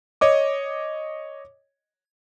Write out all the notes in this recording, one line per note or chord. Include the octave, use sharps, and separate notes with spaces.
C#5 D#5 D6